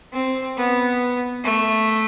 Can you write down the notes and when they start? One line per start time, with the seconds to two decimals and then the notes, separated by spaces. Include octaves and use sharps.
0.13 C4
0.57 B3
1.44 A3